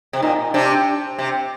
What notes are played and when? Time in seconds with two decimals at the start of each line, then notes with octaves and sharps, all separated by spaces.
0.13 C3
0.22 A#2 D#4
0.54 C3 D4
1.19 C3